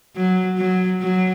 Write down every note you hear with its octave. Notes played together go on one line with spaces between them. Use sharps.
F#3
F#3
F#3